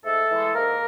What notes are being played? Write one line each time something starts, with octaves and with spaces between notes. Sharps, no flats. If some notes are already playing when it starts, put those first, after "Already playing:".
G#2 A3 A4
E3 G#3
G#2 A#3 A#4